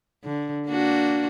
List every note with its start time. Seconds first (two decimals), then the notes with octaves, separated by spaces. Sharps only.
0.24 D3
0.68 A#3 D4 F#4